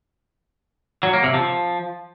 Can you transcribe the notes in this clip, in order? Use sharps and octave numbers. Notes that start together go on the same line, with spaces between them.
F#3
A#3
C3
F3